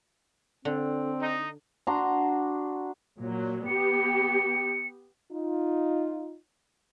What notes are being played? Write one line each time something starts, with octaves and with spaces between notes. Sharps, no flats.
D3 C4
D#4
D4 F#4 A#5 C6
A#2 F#3
B3 G4 C#7
D#4 F4